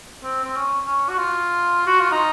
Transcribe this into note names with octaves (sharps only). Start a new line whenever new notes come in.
C4
C4
C#4
C#4
F#4
F4
F#4
F4
D#4